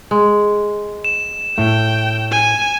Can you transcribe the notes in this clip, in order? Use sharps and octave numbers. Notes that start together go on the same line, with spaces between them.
G#3
E7
A2 A3 G5
G#5